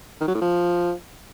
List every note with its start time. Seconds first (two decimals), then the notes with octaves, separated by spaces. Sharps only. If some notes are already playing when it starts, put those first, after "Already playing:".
0.21 D#3
0.28 F#3
0.34 A2
0.41 F3